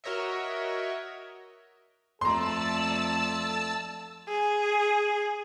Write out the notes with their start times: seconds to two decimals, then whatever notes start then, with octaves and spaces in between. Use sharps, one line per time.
0.04 F#4 A#4 C#5 D#5 E5
2.21 F2 A3 A4 D5 A5 A#5 C6 E6
4.29 G#4